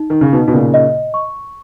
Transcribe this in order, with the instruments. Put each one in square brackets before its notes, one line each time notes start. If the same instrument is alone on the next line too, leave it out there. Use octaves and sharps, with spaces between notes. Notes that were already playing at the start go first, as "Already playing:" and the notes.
Already playing: [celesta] D#4
[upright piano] D#3
C#3
[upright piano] B2 [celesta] D#4
[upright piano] B2
A#2 C#3
[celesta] D#5
C#6